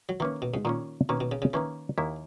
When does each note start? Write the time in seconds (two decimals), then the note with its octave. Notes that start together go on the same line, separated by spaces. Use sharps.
0.09 F#3
0.20 D#3 E3 A#3 C#4
0.42 B2
0.54 G#2
0.65 A#2 D#3 A#3 C#4
1.09 B2 D#3 A#3 C#4
1.20 B2
1.32 C#3
1.42 C#3
1.53 D#3 E3 A#3 C#4
1.98 D#2 D#3 A#3 E4